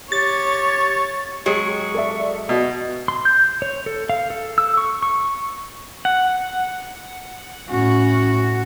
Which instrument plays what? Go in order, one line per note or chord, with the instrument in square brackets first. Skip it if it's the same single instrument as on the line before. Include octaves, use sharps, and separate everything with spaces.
[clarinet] G4 [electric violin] C#5 [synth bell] A6
[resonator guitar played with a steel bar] F#3 G#3 [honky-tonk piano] G4 [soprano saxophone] C#6
[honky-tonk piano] A4 D5 E5
[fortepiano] B2
[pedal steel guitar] C6
G6
C#5
A4
F5
A4
E6
C#6
C#6
F#5
[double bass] A2 C#4 [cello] F#4